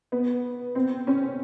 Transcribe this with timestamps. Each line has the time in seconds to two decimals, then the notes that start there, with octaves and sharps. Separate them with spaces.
0.12 B3
0.75 C4
1.07 C#4